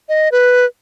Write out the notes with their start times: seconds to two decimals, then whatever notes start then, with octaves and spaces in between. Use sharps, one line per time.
0.09 D#5
0.32 B4